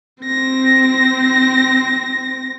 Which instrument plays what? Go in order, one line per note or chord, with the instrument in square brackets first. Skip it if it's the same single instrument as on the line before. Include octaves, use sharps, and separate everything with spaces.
[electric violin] C4 A#6